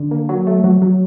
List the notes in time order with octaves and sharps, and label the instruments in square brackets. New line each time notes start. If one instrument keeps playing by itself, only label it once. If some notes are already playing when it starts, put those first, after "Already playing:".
Already playing: [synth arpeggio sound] D3
A#3
F#3
A3
F#3
F#3